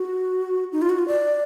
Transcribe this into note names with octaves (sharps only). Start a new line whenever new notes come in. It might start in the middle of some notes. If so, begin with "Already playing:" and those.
Already playing: F#4
D#4
F4
F#4
F4
D5